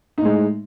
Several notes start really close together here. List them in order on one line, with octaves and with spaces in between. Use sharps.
D#4 A2 G#3